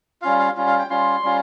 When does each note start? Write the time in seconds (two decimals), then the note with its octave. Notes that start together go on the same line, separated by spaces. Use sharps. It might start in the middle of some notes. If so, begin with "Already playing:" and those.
0.22 G3 C#4 F4 F5
0.39 F5
0.56 G3 C#4 F4
0.67 F5
0.79 G5
0.90 G3 C#4 F4 C6
1.22 G3 C#4 F4